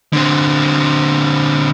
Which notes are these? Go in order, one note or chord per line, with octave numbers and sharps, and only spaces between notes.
D3 C4